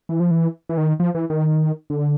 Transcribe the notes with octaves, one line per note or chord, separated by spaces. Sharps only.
E3
F3
E3
E3
D#3
F3
E3
D#3
D3